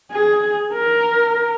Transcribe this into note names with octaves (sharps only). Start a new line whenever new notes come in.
G#4
A#4